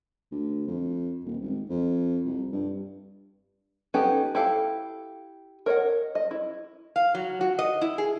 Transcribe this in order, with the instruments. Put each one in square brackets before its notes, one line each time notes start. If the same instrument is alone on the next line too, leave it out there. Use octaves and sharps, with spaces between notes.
[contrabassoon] D2
F2
D#1
G#1
F2
C2
G2
[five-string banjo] B3 C#4 D#4 G4 A4
E4 G4 A4 F5
A#4 C#5 D#5 F#5
D#5
E4
[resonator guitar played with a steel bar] F5
F#3
F#4
D#5
E4
G#4